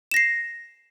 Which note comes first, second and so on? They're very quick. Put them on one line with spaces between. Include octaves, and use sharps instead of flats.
E7 A#6 C7